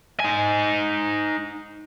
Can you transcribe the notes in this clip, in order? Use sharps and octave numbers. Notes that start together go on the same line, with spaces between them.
D#4 G#5